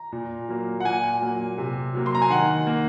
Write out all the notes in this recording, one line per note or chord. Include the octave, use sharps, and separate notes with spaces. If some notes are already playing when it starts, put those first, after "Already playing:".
Already playing: A#5
A#2
F#3 A#3
F#5
A#2 G#5
F#3 A#3
C3
F#3 A#3
C6
A#5
G#5
D#3 F#5
A#3